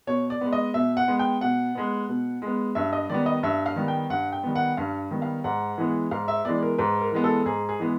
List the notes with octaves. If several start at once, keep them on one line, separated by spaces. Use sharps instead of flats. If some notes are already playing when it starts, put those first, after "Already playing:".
B2 C#5
D5
G#3 B3
D#5
B2 E5
F#5
G#3 B3
G5
B2 F#5
G#3 B3
B2
G#3 B3
G2 E5
D#5
D#3 G3 B3 D5
D#5
G2 E5
F5
D#3 G3 B3
G5
G2 F#5
G5
D#3 G3 B3
F#5
G2 F5
D#3 G3 B3
F5
G#2 F#5
E3 G#3 B3
G#2 F5
E5
E3 G#3 B3 D5
A#4
G#2 B4
A#4
E3 G#3 B3
A4
G#2 G#4
G#4
E3 G#3 B3